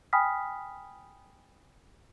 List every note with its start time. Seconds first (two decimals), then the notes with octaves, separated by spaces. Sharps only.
0.13 G5 G#5 B5 D#6 F6 B6